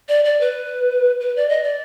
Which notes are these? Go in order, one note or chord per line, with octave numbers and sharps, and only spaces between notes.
D5
D5
B4
B4
D5
D#5
D5